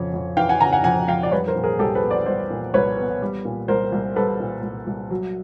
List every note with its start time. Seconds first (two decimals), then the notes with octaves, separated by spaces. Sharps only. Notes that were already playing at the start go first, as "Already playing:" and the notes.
Already playing: F2 C#3 C#5
0.13 F2
0.37 E3 F5 G5
0.49 F#5 G#5
0.60 C#3 G#5 A#5
0.72 F#5 G#5
0.84 F2 F#5 G#5
1.08 F2 F5 G5
1.23 D5
1.32 G3 B4 C#5
1.47 A#4 C5
1.56 A#2
1.63 G#4 A#4
1.79 C2 G4 A4
1.95 A4 B4
2.03 B3
2.10 C5 D5
2.26 G3 C5 D5
2.50 A#2
2.74 C2 B4 C#5
2.98 B3
3.22 G3
3.45 A#2
3.68 C2 A#4 C5
3.92 C2
4.16 G3 A4 B4
4.40 A#2
4.63 C2
4.87 C2
5.11 F#3